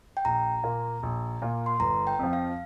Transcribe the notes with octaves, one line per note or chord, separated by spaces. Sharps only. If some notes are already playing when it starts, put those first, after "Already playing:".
G5
A#1 A#5
A#2 A#3 F4
A#1
A#2 A#3 F4
C6
G1 A#5
G5
F2 F3
F5